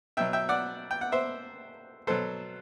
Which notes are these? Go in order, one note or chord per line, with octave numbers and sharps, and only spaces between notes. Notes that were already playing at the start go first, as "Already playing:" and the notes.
B2 F#3 E5 G5
E5 G5
D5 F#5
G5
F#5
C5 E5
B2 F#3 A4 C5